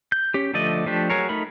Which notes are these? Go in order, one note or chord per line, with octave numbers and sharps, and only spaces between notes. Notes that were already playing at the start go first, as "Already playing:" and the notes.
G6
C#4 G4
D3 F3 A3 D5 D#5
F3 A3 D4 G4
F#3 G#4 A#4 C#5
A3 D#4 A#4 B5